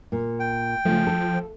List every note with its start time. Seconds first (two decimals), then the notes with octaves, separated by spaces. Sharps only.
0.12 A#2
0.40 G5
0.85 C#3 F3 A3
1.07 A4